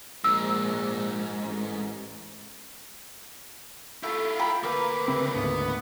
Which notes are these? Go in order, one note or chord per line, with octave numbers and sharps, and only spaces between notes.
A#1 G#2 E6
A1
A3 E4 F4
G5 A#5 B5
D2 A#3 B4
C#3 C4
D2 G#2 B3